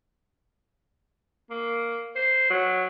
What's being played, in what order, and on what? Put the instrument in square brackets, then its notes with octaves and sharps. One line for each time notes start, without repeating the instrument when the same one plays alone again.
[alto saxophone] A#3
C5
F#3